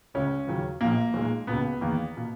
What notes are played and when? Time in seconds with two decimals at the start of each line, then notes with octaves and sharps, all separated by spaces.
0.14 C#2 C#3 G#3 C#4
0.47 D#2 C#3 F#3
0.81 A#1 A#2 A#3
1.14 B1 A#2 G#3
1.47 C#2 B2 A#3 B3
1.81 E2 D#3 A#3
2.17 B2 A#3